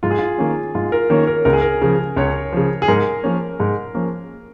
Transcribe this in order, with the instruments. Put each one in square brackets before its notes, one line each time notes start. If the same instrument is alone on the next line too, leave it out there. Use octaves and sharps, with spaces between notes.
[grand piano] G#2 [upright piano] F4
[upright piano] G#4
F4
[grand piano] D#3 A#3 C#4
[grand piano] G#2 [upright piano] F4
[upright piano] A#4
[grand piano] D#3 A#3 C#4 [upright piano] C#5
[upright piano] A#4
[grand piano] C#2 [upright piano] A#4
[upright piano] G#4
A#4
[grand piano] C#3 F3
[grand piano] C#2 [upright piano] C#5
[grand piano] C#3 F3
[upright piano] G#4
[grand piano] G#2 [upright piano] A#4
[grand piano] F3 A#3 C#4
G#2
F3 A#3 C#4